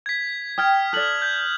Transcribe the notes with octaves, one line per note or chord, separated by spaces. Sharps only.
G#6 B6
G5 D#6 F6 G#6
A4 D5 F#6 F#7
G6 G#6